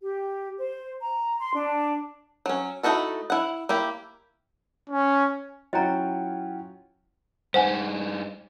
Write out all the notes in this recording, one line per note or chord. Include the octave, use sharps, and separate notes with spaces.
G4
C5
A#5
C6
D4
F#3 C#4
A3 D#4 E4 F#4 A4
E4 F#5
A#3 E4 G4
C#4
F#3 C#4 E4 F4 D#5 F#5 G5 A#5
G2 D#4 C5 F#5 G#5